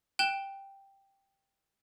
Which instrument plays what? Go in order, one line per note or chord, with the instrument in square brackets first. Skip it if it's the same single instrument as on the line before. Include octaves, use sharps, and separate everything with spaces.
[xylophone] G5 F#6 E7 G7